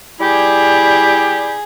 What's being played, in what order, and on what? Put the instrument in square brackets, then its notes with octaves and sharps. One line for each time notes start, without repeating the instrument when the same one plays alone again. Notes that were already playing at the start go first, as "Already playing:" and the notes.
[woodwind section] G3 E4 G4 [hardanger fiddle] G#4